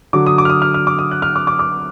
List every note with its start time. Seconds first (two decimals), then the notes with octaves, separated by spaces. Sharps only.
0.13 D3 F#3 D6
0.27 D#6
0.38 D6
0.45 F6
0.50 D#6
0.62 F6
0.74 F6
0.87 D6
0.99 D#6
1.11 F#6
1.22 F6
1.36 D6
1.47 D6
1.59 D6